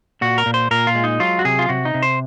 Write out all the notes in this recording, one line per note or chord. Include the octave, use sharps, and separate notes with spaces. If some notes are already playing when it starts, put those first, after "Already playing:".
A#2 F#4
A#4
A#2
C5
A#2 A#4
F4
G#3
D#4
F#3 F4
F#4
C3 G#4
F4
C3 F#4
D#4
C3
C5